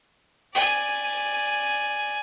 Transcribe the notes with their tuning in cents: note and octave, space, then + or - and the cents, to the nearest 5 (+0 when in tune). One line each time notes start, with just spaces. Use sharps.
D5 +0 G#5 +0